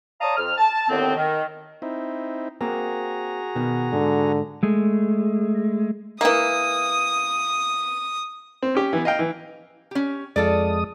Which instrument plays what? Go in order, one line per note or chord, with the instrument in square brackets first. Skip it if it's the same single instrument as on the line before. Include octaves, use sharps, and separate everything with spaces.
[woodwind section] C#5 D5 F5 A5 A#5 D#6
F2 F6
A5
D#2 A2 D3 D#3 B3 C4
D#3
[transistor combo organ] C4 D#4 E4
[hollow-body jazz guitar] A#3 C4 [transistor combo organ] F#4 G#4 A#5
[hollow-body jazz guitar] B2 D#3
[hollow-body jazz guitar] G#2 [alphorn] D3
[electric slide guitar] G#3 A3
[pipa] E3 A#3 [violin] D#6
[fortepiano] C4
C#4 G4
E3 B3
D#5 F5 G5
E3
[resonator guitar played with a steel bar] C#4 G4
[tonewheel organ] F2 G#3 D#6 [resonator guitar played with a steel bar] F4 A4 D5